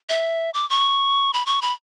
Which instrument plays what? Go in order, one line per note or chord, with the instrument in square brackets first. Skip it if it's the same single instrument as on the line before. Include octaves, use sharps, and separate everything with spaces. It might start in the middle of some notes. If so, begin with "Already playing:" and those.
[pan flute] E5
D6
C#6
B5
C#6
B5